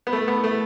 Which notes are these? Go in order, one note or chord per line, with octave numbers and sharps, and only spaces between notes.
B3
A3
B3
A3